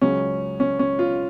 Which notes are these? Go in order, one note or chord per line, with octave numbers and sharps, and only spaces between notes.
C#2 C#3 F#3 C#4
C#4
C#4
F4